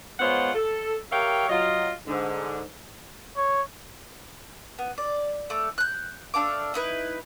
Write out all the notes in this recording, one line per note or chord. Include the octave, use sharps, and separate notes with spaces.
G#3 B3 F4 C5 C#5 F#5
A4
G4 A#4 C#5 E5 F5 G5
F#3 F4 D#5
G#2 D3
C#5
B3
D5
A3 D6
F#6 G6
A3 D4 F5 D6
D#4 E4 B4